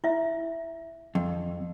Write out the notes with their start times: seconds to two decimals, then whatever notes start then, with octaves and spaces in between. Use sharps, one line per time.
0.04 E4 E5
1.15 F2